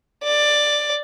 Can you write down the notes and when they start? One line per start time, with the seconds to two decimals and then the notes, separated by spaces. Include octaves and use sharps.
0.24 D5